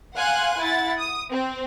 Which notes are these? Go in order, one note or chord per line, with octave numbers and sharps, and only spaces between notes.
F5 F#5 G#5 C6 F#6
E4 F#5 A6
D#6
C4